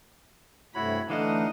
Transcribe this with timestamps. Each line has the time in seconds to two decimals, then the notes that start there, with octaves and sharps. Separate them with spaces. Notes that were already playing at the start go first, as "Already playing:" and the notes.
0.75 G2 C3 A3 E4 F#4 C#5 B5
1.10 D3 E3 A3 D4 D#4 D#5 F5 F#5